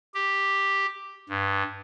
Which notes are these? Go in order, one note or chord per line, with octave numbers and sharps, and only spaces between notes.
G4
G2